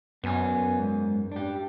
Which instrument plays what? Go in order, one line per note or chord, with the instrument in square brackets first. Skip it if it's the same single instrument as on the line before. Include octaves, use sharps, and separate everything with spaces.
[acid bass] F#2 [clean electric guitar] B3 G#5
[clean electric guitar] G#2
D4 G4